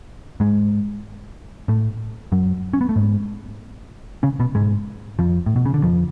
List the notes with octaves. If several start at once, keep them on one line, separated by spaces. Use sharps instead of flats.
G#2 G#3
A2 A3
F#2 F#3
C#4
B3
A3
G#2 G#3
C#3 C#4
B2 B3
G#2 G#3
F2 F3
A2
B2
C#3
D3
F2 F3